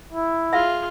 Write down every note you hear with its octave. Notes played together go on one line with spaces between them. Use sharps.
E4
F4 G#4 E5 F5